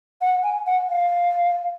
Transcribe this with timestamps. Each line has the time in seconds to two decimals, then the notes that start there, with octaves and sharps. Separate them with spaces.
0.21 F#5
0.43 G#5
0.66 F#5
0.89 F5